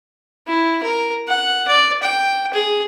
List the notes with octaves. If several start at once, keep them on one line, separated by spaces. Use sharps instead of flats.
E4
A#4
F#5
D5
G5
G#4